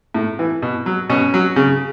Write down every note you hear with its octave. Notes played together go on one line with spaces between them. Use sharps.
A2
E3
B2
F#3
B2 C#4
F#3
C#3